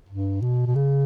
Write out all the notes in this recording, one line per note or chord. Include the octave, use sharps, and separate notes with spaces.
G2
B2
B2
C#3